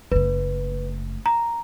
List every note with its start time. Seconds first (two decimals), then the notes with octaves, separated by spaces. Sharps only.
0.12 F#1 A3 B4
1.26 A#5